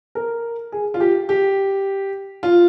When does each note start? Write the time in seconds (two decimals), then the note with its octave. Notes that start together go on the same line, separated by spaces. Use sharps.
0.15 A#4
0.72 G#4
0.94 F4
1.00 G4
1.29 G4
2.43 F4